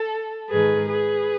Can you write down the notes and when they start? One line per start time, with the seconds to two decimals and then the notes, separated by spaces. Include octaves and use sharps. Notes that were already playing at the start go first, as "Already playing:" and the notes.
Already playing: A4
0.50 G#2 D#3 G#4 B4
0.89 G#4 B4